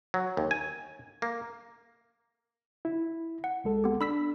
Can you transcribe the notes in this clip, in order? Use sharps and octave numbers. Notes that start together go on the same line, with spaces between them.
F#3
D#2
G#5
A#3
E4
F#5
C#2 G#3 A4
B3 G4
D4 B5 E6 B6